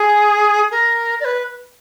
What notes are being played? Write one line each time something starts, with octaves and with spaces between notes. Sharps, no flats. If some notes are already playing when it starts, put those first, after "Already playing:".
Already playing: G#4
A#4
D5
B4